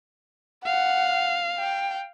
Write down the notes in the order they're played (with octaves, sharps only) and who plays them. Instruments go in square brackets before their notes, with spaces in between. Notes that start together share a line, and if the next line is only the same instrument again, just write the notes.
[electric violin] F5 [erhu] F#5
[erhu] G5